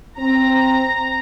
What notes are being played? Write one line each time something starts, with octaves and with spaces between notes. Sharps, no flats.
C4 A#5